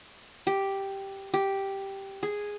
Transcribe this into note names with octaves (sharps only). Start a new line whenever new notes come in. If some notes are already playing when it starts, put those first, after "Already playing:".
G4
G4
G#4